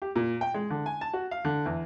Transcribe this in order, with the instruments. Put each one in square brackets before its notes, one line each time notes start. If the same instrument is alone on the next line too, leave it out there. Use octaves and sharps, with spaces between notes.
[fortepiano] G4
A#2
G5
G#3
D3
G#5
A5
F#4
F5
D3
E2